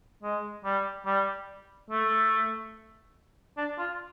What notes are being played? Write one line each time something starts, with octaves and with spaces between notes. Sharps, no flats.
G#3
G3
G3
A3
D4
F4